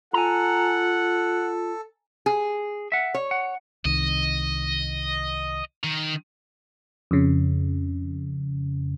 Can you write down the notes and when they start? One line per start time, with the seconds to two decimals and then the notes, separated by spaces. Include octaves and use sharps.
0.13 F4 A4 F#5 G#5 A#5
2.26 G#4
2.92 E5 F#5
3.14 C#5
3.31 F#5
3.85 C2 D#3 D#5
5.84 D#3
7.11 F2 C#3